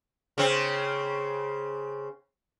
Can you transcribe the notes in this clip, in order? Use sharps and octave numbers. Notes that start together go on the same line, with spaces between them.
C#3 C4